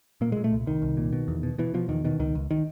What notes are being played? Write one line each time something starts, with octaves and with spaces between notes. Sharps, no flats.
A#2 A#3
A#2 G#3
A3
C2
C2 D#3
C2
A#2
B2
E2
B2
B2 E3
B2 F3
E2 D#3
B2 D#3
C#2 D#3
C#2
D#3